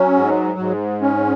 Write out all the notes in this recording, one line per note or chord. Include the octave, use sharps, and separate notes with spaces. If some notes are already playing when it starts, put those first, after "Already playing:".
Already playing: F#3 C#4
G#2
G#2
C#4